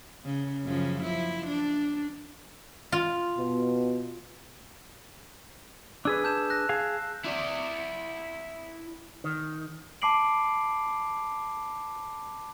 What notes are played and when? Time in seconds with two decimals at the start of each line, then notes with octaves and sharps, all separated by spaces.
0.25 C#3
0.63 F#2 C#3 F3
1.02 F3 E4
1.47 D4
2.92 F4
3.37 B2
6.05 D4 G#4 B4 E6
6.24 A5 G6 E7
6.50 F#6 A#6
6.69 G#4 F5
7.25 E4 D5
9.24 D#3
10.02 A5 B5 D6 C7 D7 F#7